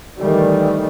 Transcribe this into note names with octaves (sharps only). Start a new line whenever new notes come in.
D#3 E3 G3 A3